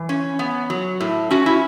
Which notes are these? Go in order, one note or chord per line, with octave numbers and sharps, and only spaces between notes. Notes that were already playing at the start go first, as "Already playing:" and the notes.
Already playing: E3
C#4
B3
F#3
A2
C#4 F#4
E4